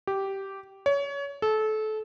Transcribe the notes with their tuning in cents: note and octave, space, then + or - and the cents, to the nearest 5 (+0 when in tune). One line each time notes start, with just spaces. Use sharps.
G4 -10
C#5 +25
A4 -25